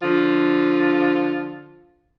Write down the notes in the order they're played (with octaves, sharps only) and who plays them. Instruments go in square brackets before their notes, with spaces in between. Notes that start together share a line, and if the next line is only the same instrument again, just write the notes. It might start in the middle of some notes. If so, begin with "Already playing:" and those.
[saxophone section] D3 F3 F4